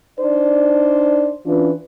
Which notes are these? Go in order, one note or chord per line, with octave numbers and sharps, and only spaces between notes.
D4 D#4 C5 D5
E3 C#4 D4 F4 B4